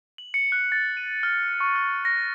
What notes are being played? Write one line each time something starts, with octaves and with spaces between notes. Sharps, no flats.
F#7
C#7
F#6
A6
D#7
F6
C#6
F6
A#6